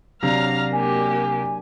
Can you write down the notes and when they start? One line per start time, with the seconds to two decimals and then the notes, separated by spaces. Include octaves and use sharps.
0.23 C3 F#3 D4 F5 A#5
0.73 A#3 G4 G#5